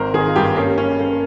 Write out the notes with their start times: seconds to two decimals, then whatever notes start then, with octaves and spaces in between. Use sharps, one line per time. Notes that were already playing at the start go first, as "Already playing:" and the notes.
Already playing: G#1 A#4 C5
0.14 D#3 G#4
0.27 F4
0.36 G2 G4
0.56 A#3 C#4
0.78 C#4
0.99 A#3